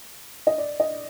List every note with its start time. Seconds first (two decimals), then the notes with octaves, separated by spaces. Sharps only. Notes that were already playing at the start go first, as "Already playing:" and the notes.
0.47 D#5
0.58 D5
0.80 D#5